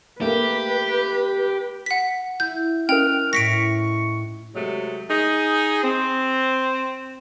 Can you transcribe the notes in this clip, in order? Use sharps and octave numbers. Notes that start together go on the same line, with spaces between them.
A3 A#3 G4 B4
F#5 B6
E4 G6
C#4 A#4 D#5 G5 G#5 F6 F#6
A2 A3 C#6 A#6 B6 D7
C3 F#3 G#3 A3
D#4 G#4
C4